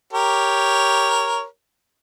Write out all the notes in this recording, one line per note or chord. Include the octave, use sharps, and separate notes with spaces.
G4 A#4 C#5